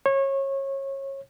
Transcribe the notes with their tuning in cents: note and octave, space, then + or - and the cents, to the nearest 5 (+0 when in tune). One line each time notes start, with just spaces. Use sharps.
C#5 -25